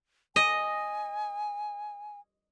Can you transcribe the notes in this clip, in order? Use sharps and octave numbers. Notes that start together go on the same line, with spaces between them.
D#5 G#5